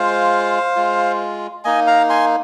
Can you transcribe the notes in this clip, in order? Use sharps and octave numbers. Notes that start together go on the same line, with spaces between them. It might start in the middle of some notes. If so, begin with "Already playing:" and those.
Already playing: G#3 F4 C5 F5
G#3 F4
A#3 D#4 D#5 G#5
F5 A#5
G#5 C6